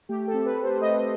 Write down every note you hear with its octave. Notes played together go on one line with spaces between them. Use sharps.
A3 G4
A4
C4
B4
C4
C5
A3 D#5